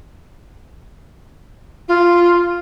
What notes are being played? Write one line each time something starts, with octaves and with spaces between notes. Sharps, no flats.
F4